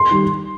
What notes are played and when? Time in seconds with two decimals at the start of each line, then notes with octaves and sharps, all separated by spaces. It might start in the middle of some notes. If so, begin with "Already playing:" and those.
Already playing: C6
0.11 D#3 G3